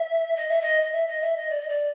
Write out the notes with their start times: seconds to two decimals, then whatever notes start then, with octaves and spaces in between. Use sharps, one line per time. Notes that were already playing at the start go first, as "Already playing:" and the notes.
Already playing: E5
0.36 D#5
0.48 E5
0.61 D#5
0.81 D#5
0.92 E5
1.06 D#5
1.21 E5
1.36 D#5
1.50 D5
1.60 D#5
1.68 D5